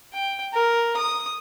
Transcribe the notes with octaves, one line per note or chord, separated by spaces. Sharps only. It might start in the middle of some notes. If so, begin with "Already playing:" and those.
G5
A#4
D#6